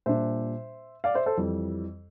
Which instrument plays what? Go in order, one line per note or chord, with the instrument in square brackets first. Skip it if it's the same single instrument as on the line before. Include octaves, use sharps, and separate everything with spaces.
[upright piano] A#2 G3 D4 C5 E5
D5 F5
C5 E5
A4 C5
F2 E3 G3